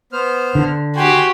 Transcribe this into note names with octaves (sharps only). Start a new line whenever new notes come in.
B3 C5 F6
D3
F#4 G4 G5 G#5 C6